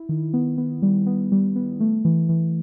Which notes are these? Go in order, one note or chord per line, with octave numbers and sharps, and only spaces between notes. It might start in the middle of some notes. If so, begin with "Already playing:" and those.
Already playing: E4
D#3
B3
B3
G3
B3
G3
B3
A3
E3
E3